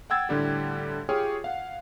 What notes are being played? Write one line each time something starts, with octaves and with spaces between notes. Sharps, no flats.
F#5 G5 E6 G#6 A6
A2 D3 G3 G4
F4 G4 G#4 C#5 G5 F6
F5 F#5